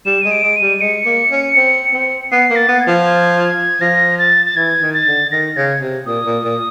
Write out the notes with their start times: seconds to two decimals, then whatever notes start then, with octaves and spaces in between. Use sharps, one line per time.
0.06 G3 E7
0.22 G#3 D#7
0.31 D7
0.43 G#3
0.56 D#7
0.62 G3
0.81 G#3 C#7
1.06 A#3
1.31 C#4
1.57 C4
1.94 C4
2.32 B3 C7
2.50 A#3
2.56 A6
2.68 B3
2.81 G#6
2.87 F3
3.06 G#6
3.44 G#6
3.81 F3 A#6
4.19 A6
4.46 A6
4.56 E3 G#6
4.82 D#3
4.94 A6
5.07 D3
5.31 D#3 A#6
5.56 C#3 G#6
5.81 C3
6.06 A#2 D#6
6.26 A#2
6.44 A#2